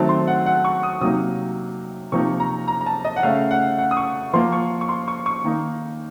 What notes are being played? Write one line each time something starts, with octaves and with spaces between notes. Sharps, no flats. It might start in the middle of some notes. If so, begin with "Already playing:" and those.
Already playing: D#3 F#3 A3 C4 A5
C6
F#5
F#5
C#6
D#6
C3 F#3 A#3 D#4 D#6
C3 F3 A#3 D#4 C#6
A#5
A#5
A#5
A5
D#5
F#5
C#3 A3 C#4 F5
F#5
F#5
D#6
C#6
F3 A#3 F4 C6
C#6
C#6
C6
C#6
C#6
D#3 A#3 D#4